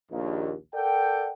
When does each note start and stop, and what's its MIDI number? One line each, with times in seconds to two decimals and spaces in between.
0.12 0.53 34
0.12 0.53 39
0.74 1.30 69
0.74 1.30 70
0.74 1.30 74
0.74 1.30 78
0.74 1.30 79